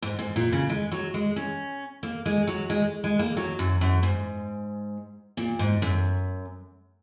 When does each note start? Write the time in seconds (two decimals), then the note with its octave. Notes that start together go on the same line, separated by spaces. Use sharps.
0.02 G#2
0.19 G#2
0.36 A#2
0.52 C#3
0.69 G#3
0.91 F#3
1.14 G#3
1.36 C#4
2.03 A#3
2.26 G#3
2.47 F#3
2.70 G#3
3.04 G#3
3.19 A#3
3.37 F#3
3.59 F#2
3.81 F#2
4.03 G#2
5.37 A#2
5.59 G#2
5.82 F#2